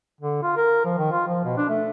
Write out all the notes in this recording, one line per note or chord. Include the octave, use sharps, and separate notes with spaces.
D3
F4
A#4
F3
D#3
F4
F3
B2
D4
A3